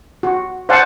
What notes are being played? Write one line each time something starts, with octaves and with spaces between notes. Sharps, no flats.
F#4
C5 D5 F5 F#5 G#5 A5